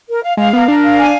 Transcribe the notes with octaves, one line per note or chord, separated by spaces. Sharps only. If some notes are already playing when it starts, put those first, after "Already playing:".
A#4
F5
G#3 F5
B3 A#4
D4 A#4
F5
G#5